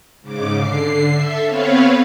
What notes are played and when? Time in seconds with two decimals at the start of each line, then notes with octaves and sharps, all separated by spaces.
0.21 G#2 C#3 D6
0.58 D3 C7
1.12 A4 E5
1.44 B3 C4 B4 C#5 F5